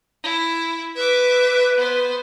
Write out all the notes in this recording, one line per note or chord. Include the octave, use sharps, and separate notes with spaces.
E4
B4 E5 D6
B3 C5